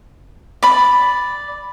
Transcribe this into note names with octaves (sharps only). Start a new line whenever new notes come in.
D5 B5